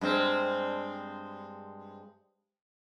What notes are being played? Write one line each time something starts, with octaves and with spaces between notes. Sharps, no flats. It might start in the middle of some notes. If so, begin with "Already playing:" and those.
G2 G#3 C4